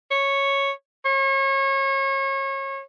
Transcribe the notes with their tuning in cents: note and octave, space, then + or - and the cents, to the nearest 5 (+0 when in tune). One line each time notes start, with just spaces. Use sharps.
C#5 -5
C#5 -30